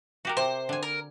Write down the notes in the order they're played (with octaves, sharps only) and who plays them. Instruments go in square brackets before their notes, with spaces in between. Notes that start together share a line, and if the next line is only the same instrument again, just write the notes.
[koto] F#4 G4 A#4
[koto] C3 [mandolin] C5
[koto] D3 G#5
[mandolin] A#4